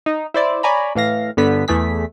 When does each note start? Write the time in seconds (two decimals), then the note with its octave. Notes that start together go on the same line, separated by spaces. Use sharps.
0.06 D#4
0.34 E4 C5 D5
0.63 C#5 D5 G#5 A#5 B5
0.95 A2 E3 F5 A#6
1.37 G1 D3 B3 B6
1.68 E2 E3 A3 G#4 B6